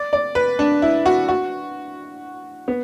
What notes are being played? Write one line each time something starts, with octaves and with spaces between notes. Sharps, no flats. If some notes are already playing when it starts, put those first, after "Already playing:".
Already playing: D5
D5
B4
D4
E4
F#4
F#4
B3